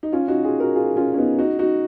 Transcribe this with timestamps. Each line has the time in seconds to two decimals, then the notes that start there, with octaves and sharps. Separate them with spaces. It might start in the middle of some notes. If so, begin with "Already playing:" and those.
0.03 D#4
0.12 C#4 F4
0.28 D#4 F#4
0.44 F4 G#4
0.60 F#4 A#4
0.75 F4 G#4
0.96 C#4 F4
1.14 C#4
1.18 B3 D#4
1.39 D#4 F#4
1.59 D#4 F#4